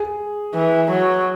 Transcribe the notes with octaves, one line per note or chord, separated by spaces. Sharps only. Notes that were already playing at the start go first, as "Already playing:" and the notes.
Already playing: G#4
E3
F#3